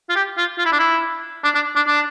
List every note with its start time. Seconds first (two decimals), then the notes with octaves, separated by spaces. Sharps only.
0.10 F4
0.16 G4
0.37 F4
0.58 F4
0.65 E4
0.72 D4
0.80 E4
1.44 D4
1.55 D4
1.76 D4
1.87 D4